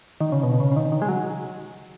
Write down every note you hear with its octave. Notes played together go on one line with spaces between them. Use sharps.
D#3
C#3
B2
C#3
C#3
D#3
D#3
G#3
F#3